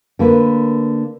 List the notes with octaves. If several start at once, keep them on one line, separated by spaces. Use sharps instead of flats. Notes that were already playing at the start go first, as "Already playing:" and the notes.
D3 A#3 B4